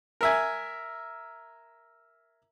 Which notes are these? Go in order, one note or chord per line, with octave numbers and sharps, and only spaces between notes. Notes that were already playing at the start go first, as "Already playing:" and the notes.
A#4 E5 G#5